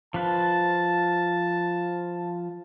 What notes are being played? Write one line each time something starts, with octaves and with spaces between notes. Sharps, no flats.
F3 B4 A5